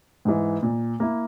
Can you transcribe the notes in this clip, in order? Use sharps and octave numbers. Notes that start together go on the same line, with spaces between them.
G#2 E3
A#2
A#3 E4